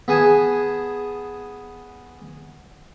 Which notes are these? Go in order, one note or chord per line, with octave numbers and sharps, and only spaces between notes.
B3 G#4 G#5 A5